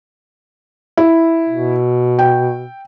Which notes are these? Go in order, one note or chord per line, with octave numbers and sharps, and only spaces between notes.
E4
B2
G5